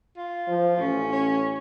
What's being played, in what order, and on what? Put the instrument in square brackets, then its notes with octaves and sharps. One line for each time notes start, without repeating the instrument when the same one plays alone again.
[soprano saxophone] F4
[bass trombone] F3
[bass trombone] A1 [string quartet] C#4
[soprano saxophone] C#5